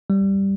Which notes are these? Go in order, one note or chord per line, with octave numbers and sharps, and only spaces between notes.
G3